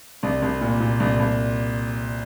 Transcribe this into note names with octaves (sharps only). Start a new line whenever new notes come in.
C2
C2
A#2
A#2
C2
C2